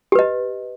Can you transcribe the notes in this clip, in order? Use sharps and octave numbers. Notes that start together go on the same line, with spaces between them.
G4 B4 D#5